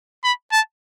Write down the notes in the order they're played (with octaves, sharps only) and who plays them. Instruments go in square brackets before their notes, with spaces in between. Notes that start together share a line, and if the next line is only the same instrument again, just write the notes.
[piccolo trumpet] B5
A5